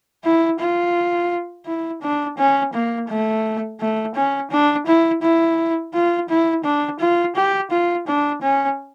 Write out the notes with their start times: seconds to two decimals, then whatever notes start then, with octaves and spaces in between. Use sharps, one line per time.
0.24 E4
0.59 F4
1.66 E4
2.02 D4
2.38 C#4
2.74 A#3
3.09 A3
3.80 A3
4.15 C#4
4.51 D4
4.87 E4
5.22 E4
5.94 F4
6.29 E4
6.64 D4
7.00 F4
7.36 G4
7.71 F4
8.07 D4
8.42 C#4